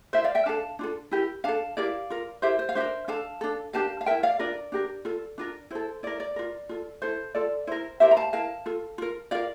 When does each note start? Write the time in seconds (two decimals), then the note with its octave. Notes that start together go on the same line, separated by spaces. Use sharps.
0.13 E4 A#4 C5 E5
0.24 D5 F5
0.35 E5 G5
0.46 D4 A4 F5 A5
0.79 D4 F4 A4
1.11 E4 G4 A#4
1.44 D4 A4 F5 A5
1.77 E4 G4 A#4 D5 F5
2.10 F4 A#4
2.42 E4 G4 A#4 C5 E5
2.59 C5
2.69 F5
2.75 D4 G4 A#4 C5 E5
3.08 D4 A4 F5 A5
3.41 D4 A4
3.73 D4 G4 A#4 F5 A5
4.01 F5
4.06 E4 A#4 E5 G5
4.23 D5 F5
4.39 D4 F4 A#4 D5
4.72 D4 G4 A#4
5.05 F4 A4
5.38 D4 F4 A#4
5.71 E4 A4 C5
6.03 E4 A#4 D5
6.20 D5
6.36 F4 A#4
6.69 F4 A4
7.02 E4 A4 C5
7.35 F4 A4 D5
7.67 E4 A#4 C5
8.00 E4 G4 A#4 C5 E5
8.11 A#5
8.17 F5 A5
8.33 E4 A#4 F5 A5
8.66 F4 A4
8.98 F4 A#4
9.31 F4 A#4 D5 F5